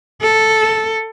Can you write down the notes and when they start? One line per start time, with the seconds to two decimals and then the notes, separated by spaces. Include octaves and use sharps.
0.21 A4